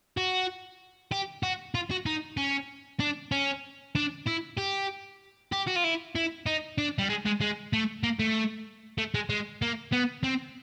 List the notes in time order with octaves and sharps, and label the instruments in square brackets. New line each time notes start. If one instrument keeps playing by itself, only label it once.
[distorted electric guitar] F#4
G4
F#4
F4
F#4
D#4
C#4
D4
C#4
D4
E4
G4
G4
F#4
F4
E4
E4
D#4
D4
G3
G#3
G#3
G#3
A3
A#3
A3
A3
G#3
G#3
A#3
B3
C4